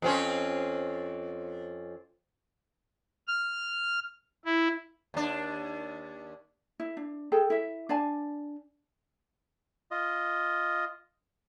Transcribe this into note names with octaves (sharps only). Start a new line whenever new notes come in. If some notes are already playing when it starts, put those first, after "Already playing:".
F2 C4 C#4
F6
E4
D#2 D4
E4
D4
G#4 A4 G5
E4 E5
D4 D5 G#5 A5
F4 D#5